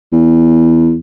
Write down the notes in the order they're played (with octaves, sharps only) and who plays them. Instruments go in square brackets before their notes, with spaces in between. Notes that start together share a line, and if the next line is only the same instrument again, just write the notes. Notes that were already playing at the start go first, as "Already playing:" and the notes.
[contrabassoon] E2